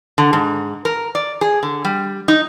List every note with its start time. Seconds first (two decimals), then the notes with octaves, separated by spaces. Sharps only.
0.18 D3
0.33 G#2
0.85 A#4
1.15 D5
1.41 G#4
1.63 D3
1.85 G3
2.28 D#4